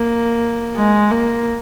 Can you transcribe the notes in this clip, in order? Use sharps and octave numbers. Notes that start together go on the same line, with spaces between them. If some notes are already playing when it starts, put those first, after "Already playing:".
Already playing: A#3
G#3
A#3